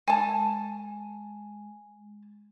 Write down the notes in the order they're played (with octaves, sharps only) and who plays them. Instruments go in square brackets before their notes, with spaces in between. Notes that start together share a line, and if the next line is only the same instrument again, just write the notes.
[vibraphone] G#3 [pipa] G#5 A5